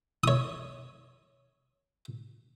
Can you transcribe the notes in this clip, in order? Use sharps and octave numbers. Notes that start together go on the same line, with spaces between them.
C#5 D#6